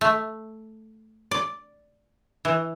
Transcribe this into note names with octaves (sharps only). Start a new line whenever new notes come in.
A3
D5
E3